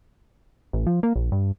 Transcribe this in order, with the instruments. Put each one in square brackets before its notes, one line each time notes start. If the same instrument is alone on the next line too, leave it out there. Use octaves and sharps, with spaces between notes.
[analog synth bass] A1
F3
A#3
A#1
G2